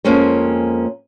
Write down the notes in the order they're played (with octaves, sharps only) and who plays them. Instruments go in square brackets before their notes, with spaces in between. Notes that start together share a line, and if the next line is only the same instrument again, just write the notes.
[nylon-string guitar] F2 G#3 A#3 C#4 C5